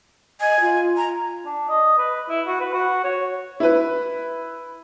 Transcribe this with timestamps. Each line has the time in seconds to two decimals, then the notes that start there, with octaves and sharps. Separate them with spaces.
0.40 D#5 G#5
0.60 F4
0.97 A#5
1.45 D4
1.69 D#5
1.98 B4
2.29 E4
2.47 F#4
2.60 B4
2.73 F#4
3.04 C#5
3.60 E4 B4